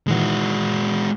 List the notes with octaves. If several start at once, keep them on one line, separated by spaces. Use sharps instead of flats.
A#2 D#3 E3 G#3 F#4